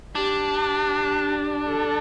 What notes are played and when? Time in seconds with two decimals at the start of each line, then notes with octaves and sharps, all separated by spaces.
0.15 D4 G4
1.67 A4